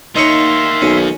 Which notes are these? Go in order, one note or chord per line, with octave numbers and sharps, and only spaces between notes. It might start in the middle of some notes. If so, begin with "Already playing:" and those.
D#3 A#3 D#4 C#5 E5 C6 C#6
B1 C#4